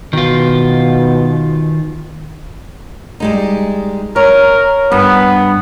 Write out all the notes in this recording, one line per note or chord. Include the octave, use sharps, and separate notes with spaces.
B2 D#3 F4
G3 G#3 D#4
A#4 C#5
G2 B3